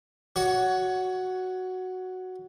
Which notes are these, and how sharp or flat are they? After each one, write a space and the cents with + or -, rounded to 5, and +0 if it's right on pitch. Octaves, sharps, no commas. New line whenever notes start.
F#4 +0 C#5 +20